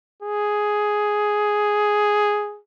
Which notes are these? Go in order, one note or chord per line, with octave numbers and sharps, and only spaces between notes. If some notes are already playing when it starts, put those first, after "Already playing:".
G#4